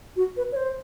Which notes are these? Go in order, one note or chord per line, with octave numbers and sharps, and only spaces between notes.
F#4
B4
C#5
C5